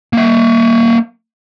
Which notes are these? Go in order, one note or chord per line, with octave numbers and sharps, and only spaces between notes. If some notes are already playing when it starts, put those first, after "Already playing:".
A#3 E5